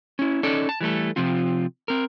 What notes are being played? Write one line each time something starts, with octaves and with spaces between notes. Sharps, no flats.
C#4 E4
C#4 D#4 A4 D5
A5
E3 G3 A3 A4
C3 F3 C4 F4
C4 A#4